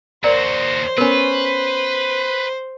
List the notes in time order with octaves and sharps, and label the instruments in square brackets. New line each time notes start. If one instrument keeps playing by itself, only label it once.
[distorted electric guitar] D#2 F#4 [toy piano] A#4 D5 A#5 [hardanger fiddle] C5
[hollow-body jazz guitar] B3 C#4 [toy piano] A#4 G#5 [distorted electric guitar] B4